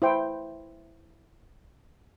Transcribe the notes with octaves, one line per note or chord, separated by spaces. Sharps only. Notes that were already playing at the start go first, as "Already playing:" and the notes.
E4 C5 G5